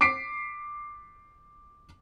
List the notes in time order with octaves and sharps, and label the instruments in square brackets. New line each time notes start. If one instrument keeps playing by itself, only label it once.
[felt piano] D6 B6 C7 D7